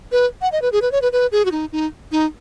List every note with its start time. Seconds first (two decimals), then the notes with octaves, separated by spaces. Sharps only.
0.12 B4
0.42 F#5
0.52 D#5
0.62 B4
0.72 G#4
0.82 B4
0.92 C#5
1.02 B4
1.12 B4
1.32 G#4
1.45 F#4
1.52 D#4
1.72 D#4
2.12 D#4